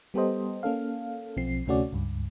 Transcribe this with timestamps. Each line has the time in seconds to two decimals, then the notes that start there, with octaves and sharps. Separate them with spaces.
0.14 G3 B3 G4 A4 C5 D#5
0.63 A#3 C#4 A4 F5
1.37 B1 F3 C4 C7
1.67 D2 C3 A3 C#4 F#4 D5
1.93 C#2 G2